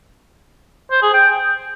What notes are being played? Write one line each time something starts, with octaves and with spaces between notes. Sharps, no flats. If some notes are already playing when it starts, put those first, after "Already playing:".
C5
G#4
G5